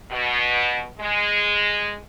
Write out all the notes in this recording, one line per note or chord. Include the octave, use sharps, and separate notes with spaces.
B2
G#3